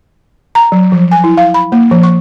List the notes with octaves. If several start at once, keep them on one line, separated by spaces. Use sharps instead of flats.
A#5
F#3
F3
G#5
E4
F5
B5
A#3
F3
C#6